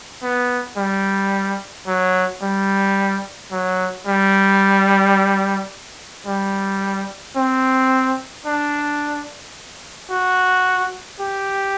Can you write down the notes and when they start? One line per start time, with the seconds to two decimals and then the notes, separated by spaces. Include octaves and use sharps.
0.23 B3
0.77 G3
1.87 F#3
2.42 G3
3.52 F#3
4.07 G3
6.27 G3
7.36 C4
8.46 D4
10.11 F#4
11.20 G4